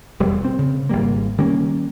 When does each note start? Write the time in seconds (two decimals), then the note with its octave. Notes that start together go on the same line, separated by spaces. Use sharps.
0.20 E1 G3
0.45 C4
0.59 C#3
0.89 G#1 G3 A#3
1.38 D#3 G3 A#3 C#4